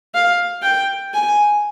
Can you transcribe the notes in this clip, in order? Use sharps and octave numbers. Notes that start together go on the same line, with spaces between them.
F5
G5
G#5